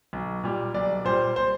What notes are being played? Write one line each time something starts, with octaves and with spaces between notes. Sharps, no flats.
B1
A#2 G3
B1 D5
A#2 G3 C5
C5